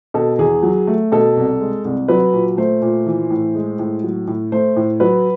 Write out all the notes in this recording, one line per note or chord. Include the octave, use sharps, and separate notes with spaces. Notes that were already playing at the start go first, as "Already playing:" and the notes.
B2 A4
E2 G#4
F#3
A3
B2 A4
C2
G#3
C2
F#3 B4
A#2
A3 C5
A#2
E3
A2
G#3
A2
F#3
A2
A3 C5
A2
F#3 B4